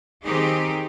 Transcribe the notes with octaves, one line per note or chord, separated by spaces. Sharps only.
D#3 C4 D#4 G4 G#4